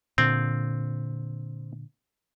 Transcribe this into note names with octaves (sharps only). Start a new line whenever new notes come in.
A#2 D3 C4